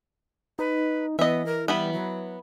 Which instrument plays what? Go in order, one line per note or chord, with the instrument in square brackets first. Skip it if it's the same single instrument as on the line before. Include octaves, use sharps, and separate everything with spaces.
[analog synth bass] D#4 [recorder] B4
[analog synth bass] E3 [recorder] B3 [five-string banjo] D#5 E5
[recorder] A#4
[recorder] G3 [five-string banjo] B3 E4 B4
[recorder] F#3